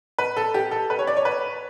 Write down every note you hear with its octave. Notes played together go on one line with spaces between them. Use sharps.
B4
A4
G4
A4
B4
C#5
D5
C#5
B4